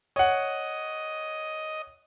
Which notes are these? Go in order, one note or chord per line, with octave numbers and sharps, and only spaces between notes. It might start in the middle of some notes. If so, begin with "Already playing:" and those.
C#5 D#5 F#5